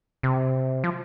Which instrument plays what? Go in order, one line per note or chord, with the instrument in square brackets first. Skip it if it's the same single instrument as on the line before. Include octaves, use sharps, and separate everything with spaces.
[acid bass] C3
F3